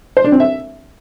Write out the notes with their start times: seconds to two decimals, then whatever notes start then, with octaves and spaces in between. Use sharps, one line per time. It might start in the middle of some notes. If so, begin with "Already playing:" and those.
0.17 C5
0.24 D4
0.32 C4
0.40 E5